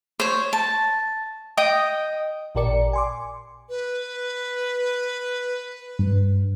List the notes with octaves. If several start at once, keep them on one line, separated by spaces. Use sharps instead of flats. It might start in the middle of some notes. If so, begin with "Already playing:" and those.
C5 C#5
A5
D#5 G5 D#6
A1 A#2 G4 A#4 D5 C#7
G#5 C6 D6
B4
G2